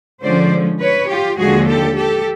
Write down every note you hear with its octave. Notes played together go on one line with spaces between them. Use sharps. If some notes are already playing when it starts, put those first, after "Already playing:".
D3 F3 G#3 C#4 C5 D5
B4 C#5
F4 G4
D#2 D3 F3 G#3 F#4 G#4
G4 A4
G4 A4